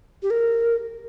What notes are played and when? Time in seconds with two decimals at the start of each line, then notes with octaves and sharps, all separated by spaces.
0.23 G4
0.30 A#4